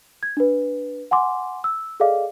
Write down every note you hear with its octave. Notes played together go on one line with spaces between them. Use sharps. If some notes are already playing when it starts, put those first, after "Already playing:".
G#6
D4 B4
F#5 G#5 C6 D6
E6
G#4 A4 D5 D#5 F5 D6